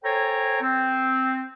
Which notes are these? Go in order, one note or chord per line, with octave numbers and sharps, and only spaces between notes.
A4 C5 C#5 G5 G#5 A#5
C4